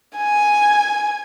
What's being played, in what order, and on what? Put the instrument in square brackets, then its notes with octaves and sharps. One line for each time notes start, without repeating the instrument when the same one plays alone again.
[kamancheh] G#5